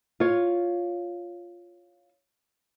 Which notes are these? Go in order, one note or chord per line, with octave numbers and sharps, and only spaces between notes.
F4 C#5